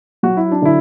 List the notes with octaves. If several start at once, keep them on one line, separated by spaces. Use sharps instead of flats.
F#3 F#4
E4
D4
D3 E4